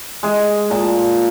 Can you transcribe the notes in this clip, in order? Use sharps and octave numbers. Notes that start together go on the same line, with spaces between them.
G#3 G#4
A#2 A5